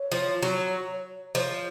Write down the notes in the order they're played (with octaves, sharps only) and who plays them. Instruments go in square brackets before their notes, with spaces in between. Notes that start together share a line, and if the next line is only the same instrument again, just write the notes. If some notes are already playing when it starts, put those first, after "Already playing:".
Already playing: [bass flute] C#5
[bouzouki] F3
F#3
[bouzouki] F3 [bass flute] C#5